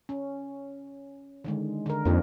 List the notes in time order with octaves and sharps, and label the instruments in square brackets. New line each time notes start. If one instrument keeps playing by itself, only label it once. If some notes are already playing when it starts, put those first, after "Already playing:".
[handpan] C#4
D3 D#3 G#3
D3 A#4
[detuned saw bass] F2 [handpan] A#3 D4 D#4